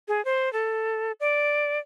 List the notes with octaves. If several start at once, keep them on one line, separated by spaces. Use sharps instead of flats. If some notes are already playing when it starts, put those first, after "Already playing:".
G#4
C5
A4
D5